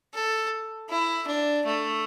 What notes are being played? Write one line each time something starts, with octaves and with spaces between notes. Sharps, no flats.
A4
E4
D4
A3